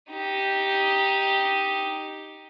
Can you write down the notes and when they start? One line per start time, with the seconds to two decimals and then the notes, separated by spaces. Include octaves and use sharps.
0.11 D#4 G4